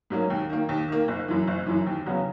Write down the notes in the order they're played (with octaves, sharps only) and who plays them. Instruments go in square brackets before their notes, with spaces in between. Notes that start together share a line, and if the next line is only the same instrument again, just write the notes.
[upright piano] G#2 F#3 A#3 C#4
D#2
D#3 A#3
D#2
D#3 A#3
F#1
F#2 E3
F#1
F#2 E3
D#2
C#3 F#3 B3